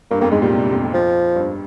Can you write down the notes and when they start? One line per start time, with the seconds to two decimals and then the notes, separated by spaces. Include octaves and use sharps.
0.11 G2 A#3
0.21 F2 A#3
0.31 G#2 G#3
0.42 A#2 G3
0.53 C3
0.63 G2
0.72 F2
0.84 F2
0.93 F3
1.36 G2